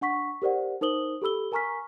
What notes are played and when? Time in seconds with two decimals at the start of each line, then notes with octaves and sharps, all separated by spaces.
0.01 D4 F#5 C#6 B6
0.42 G4 A#4 C5 D5 F#5
0.81 D#4 A#4 C5 D#6 F#7 G7
1.22 G4 A4 B5 E6 G7
1.52 A#4 G#5 A#5 C#6 F6 B6